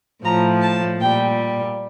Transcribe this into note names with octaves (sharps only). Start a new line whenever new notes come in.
A2 F3 A#5
A5
A#2 G3 G5